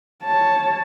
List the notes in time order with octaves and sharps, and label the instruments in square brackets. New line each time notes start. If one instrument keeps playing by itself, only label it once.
[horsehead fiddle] C#5 A5